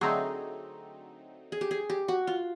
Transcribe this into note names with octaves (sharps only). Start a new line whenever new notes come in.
D3 F#3 A3 C4 D#4 G#4
G#4
G4
G#4
G4
F#4
F4